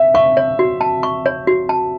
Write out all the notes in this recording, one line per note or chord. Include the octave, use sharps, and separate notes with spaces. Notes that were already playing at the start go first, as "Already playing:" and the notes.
Already playing: E5
E5 C#6
C#5
F#4
A5
C#6
C#5
F#4
A5